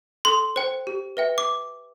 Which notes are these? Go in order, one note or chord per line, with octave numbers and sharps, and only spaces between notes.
A4 C6
C5 G5
G4
B4 E5 G5
D6